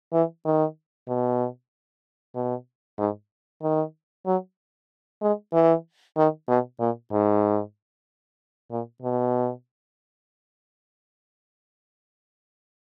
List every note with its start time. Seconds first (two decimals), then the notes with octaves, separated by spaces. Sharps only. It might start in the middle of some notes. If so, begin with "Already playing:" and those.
0.13 E3
0.45 D#3
1.08 B2
2.35 B2
2.99 G#2
3.62 D#3
4.26 F#3
5.22 G#3
5.53 E3
6.17 D#3
6.48 B2
6.80 A#2
7.12 G#2
8.71 A#2
9.02 B2